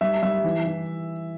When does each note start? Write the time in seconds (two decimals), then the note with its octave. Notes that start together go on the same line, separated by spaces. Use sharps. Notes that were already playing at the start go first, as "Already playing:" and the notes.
0.01 G3 E5
0.23 G3 E5
0.44 E3
0.66 E3